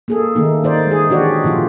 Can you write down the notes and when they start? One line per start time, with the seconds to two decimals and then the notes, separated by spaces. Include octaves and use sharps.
0.08 A#3 G#4 A4
0.35 D#3 A3 A#3 D#4
0.64 D#4 C5 D5
0.87 G#3 G#4
1.10 E3 D4 F#4 G4 C#5 D5
1.44 A#2 C#3 F3 F4